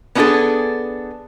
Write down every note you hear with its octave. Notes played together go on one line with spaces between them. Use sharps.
B3 C#4 D4 F#4 G#4 A4